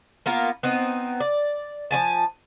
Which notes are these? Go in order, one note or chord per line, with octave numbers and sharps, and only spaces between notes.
A#3 B3 F4 A#4
B3 C4 D#4
D5
F3 C#4 G#5 A5